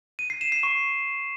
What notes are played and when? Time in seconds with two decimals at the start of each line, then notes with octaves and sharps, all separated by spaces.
0.19 D#7
0.30 C7
0.41 E7
0.52 C7
0.63 C#6